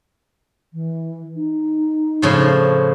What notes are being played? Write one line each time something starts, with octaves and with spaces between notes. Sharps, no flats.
E3
D#4
A2 C#3 F3